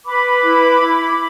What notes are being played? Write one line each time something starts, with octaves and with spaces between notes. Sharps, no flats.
B4 B5 D6
E4
E4